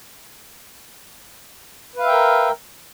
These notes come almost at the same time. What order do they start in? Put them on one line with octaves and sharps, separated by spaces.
B4 F5 E5 G5 A#4